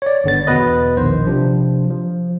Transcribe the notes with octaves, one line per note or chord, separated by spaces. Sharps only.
C#5 D5
G1 D3 B3 A6
E2 B2 B3 B4 D#5
A#1 D#3 C5
C3 F3 D4
F3